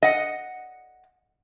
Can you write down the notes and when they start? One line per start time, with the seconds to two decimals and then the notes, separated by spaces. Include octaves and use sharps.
0.03 D#5 F#5